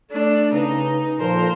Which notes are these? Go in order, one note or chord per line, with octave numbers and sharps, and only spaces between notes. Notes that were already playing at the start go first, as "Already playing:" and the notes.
A3 D4
C#3 D#4 B4
A#2 F3 A4 A#4 C5